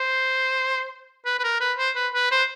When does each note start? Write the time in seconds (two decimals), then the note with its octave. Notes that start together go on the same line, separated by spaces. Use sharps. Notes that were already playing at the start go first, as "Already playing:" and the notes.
Already playing: C5
1.25 B4
1.39 B4
1.43 A#4
1.60 B4
1.78 C5
1.96 B4
2.14 B4
2.31 C5